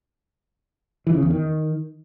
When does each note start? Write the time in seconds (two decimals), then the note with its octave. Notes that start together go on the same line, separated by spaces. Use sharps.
1.07 E3
1.15 C#3
1.23 E2
1.31 D#3